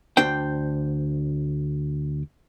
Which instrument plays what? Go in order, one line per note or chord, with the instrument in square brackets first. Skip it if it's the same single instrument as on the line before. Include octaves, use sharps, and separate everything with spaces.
[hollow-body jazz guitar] D2 D4 C5 G5